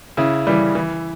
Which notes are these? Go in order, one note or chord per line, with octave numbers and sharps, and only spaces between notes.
C#3 E4
E3 G3
E3